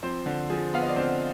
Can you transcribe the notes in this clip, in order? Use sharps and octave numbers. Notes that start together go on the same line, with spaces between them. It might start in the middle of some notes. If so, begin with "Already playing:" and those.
F3 C4 C5
D3
F3 G#4
B3 F5
D#5
D5
D3 C4 C5